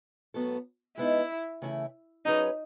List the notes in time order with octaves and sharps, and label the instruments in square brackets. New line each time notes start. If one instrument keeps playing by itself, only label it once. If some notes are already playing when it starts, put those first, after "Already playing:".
[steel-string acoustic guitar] A2 F#3 B3 F#4 A4
[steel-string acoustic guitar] G#3 B3 D#4 [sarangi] E4
[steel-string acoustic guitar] C#3 E3 A3 E4
[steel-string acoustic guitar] F#3 C#4 G#4 B4 [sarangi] D#4